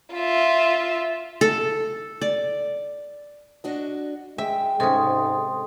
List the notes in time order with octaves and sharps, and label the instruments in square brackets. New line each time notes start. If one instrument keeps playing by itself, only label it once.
[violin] F4 E5
[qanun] A4
D5
[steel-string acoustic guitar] D4 F#4 D#5
[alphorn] G#3 [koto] E5 [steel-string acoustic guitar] G5
[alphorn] G#2 [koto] C3 C#4 [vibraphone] A4 C6 D#6